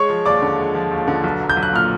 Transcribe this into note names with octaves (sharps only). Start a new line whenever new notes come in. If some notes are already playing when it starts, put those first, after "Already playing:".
Already playing: G#3 C#5 C#6
F3
D#2 D5 D6
D3
G#3
F3
D#2
D3
B1
F#3
G6
B1
F#6
A#2 F6